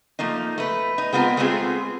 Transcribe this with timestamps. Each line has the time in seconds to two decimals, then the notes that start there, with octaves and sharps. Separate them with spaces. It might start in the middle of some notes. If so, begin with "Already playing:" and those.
0.19 F3 A3 A#3 D#4
0.58 A3 B4
0.98 D#4
1.13 G#3 B3 C4 F4 A#4
1.37 G#3 A3 B3 C4 F4 G#4